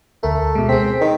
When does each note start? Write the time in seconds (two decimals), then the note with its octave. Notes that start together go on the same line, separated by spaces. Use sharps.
0.23 D2 A3 A#4
0.55 B2 G#3
0.69 C4 G#4 B6
1.01 D#3